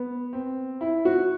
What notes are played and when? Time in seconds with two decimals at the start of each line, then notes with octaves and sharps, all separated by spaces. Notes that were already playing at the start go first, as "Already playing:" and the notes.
Already playing: B3
0.33 C4
0.81 E4
1.05 F#4